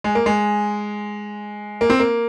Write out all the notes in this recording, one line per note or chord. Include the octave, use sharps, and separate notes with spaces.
G#3
A#3
G#3
A#3
C4
A#3